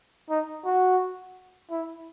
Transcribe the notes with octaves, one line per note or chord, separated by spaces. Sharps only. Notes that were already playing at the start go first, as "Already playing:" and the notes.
D#4
F#4
E4